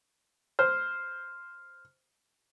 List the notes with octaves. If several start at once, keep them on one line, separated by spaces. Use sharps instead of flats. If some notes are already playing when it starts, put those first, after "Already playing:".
C5 F6